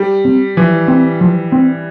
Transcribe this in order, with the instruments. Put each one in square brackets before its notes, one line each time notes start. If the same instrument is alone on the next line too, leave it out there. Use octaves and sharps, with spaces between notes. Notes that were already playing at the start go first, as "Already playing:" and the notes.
Already playing: [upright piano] G3
[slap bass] C4
[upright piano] E3 [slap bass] F3
[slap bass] C4
F3
C4